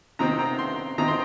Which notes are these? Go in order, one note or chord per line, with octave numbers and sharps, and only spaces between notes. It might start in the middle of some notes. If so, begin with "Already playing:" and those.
C3 D#3 C4 A#5
A#5
C6
D#3 C4 A#5
C6